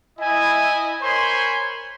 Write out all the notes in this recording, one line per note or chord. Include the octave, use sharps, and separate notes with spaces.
E4 D#5 G#5
A#4 C5 C#5 G#5 B5 C6